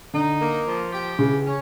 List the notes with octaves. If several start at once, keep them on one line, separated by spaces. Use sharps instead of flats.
D3 D#4
A#3
F3
G4
C#3 E3
C#4